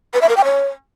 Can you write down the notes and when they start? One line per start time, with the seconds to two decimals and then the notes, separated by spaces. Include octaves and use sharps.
0.14 B4
0.21 E5
0.29 A#4
0.37 G5
0.44 C#5